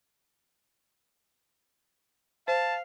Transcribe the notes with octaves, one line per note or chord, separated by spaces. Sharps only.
C5 F5 A5